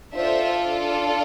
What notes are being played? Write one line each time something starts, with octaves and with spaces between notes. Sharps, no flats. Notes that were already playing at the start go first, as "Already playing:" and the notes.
D4 F4 A4 C5 E5